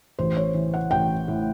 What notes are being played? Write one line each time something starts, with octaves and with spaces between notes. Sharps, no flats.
A1 C5
C#5
E3
F#5
A1 G5
A2